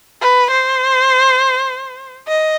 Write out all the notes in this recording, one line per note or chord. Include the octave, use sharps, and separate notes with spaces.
B4
C5
D#5